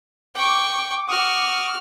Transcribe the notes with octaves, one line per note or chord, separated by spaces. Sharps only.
G5 C#6 D6
F#4 C#6 D#6 F6